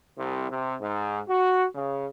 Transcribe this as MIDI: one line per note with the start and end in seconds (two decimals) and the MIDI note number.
0.18 0.47 36
0.50 0.75 48
0.81 1.21 44
1.29 1.64 66
1.75 2.06 49